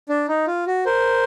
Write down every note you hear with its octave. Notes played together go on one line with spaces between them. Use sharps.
D4
D#4
F4
F#4
A#4 C5